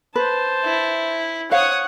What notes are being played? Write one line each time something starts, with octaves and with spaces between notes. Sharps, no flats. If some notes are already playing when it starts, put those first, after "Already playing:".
B4 C5 A5
E4
C5 C#5 F5 F#5 D#6